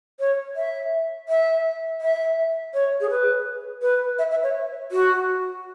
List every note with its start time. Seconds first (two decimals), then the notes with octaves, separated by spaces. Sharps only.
0.20 C#5
0.56 E5
1.29 E5
2.01 E5
2.74 C#5
3.00 G#4
3.10 B4
3.82 B4
4.19 E5
4.31 E5
4.43 C#5
4.92 F#4